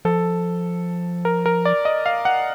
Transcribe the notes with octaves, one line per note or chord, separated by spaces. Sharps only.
F3 A4
A#4
A#4
D5
D#5
F5
F#5